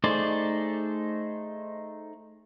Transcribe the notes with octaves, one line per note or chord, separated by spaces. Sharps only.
A3 D#4 G#4 C5 D5